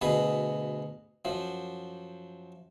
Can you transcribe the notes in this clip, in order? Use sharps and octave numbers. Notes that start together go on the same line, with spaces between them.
D2 B2 G#4 B4
F#2 F3